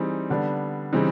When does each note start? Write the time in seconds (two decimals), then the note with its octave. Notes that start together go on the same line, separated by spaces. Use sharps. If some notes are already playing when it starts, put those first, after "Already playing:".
Already playing: E3 G3 C4 D#4 G#4
0.30 D3 G3 B3 D4
0.93 C#3 E3 G3 C4 D#4